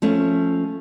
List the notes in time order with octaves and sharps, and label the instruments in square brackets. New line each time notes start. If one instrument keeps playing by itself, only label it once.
[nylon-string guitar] F3 A3 C#4